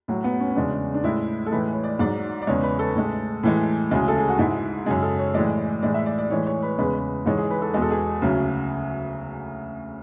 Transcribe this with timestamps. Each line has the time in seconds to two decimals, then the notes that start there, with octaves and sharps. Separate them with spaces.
0.08 A2 F#3 F#4
0.24 B3
0.40 C#4
0.51 C#4
0.56 E2 C#3 G#3 D4
0.94 D4
1.04 A2 G#3 E4
1.46 A4
1.52 A2 E3 G#3 B4
1.72 C#5
1.84 D5
1.99 G#2 F#3 D5
2.42 D5
2.47 E2 C#3 G#3 C#5
2.63 B4
2.79 A4
2.95 A2 G#3
3.43 A2 E3 G#3
3.91 D2 C#3 G#3 G#4
4.08 A4
4.18 G#4
4.28 F#4
4.39 G#2 G#3 E4
4.86 F#2 C#3 G#3 G#4
5.03 A4
5.19 C#5
5.34 A2 E3 G#3 D5
5.82 A2 E3 G#3 D5
5.94 E5
6.06 D5
6.18 D5
6.30 A2 E3 G#3 C#5
6.47 C#5
6.62 B4
6.78 E2 C#3 G#3 B4
7.26 G#2 E3 G#3 C#5
7.38 G#4
7.50 B4
7.62 A4
7.74 E2 B2 G#3 G#4
7.82 A4
7.91 G#4
8.22 D2 C#3 F#3